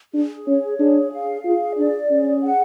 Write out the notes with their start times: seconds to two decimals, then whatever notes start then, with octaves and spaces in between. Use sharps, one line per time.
0.14 D4 G#4
0.47 C#4 C#5
0.79 D4 G#4
1.12 F5
1.45 F4 G#4
1.77 D4 D5
2.11 C#4 G#4
2.43 F#5